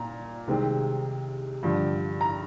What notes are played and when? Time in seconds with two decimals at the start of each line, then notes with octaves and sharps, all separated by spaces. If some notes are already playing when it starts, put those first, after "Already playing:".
Already playing: A#2 A#5
0.47 C2 C3 D#3 G#3 C4
1.63 G2 D3 F3
2.21 A#5